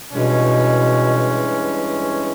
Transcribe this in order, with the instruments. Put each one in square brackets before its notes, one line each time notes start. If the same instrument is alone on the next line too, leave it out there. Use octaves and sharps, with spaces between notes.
[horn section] G2 E3 G#3 C#4 [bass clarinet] B2